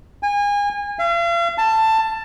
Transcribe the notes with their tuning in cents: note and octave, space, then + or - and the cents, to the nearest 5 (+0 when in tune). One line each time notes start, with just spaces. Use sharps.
G#5 -30
F5 -40
A5 +10